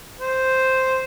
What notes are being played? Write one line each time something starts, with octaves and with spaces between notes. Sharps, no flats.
C5